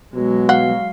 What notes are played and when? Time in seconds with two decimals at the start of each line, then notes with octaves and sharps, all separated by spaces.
0.14 B2 F#3 G#3
0.49 F5 F#5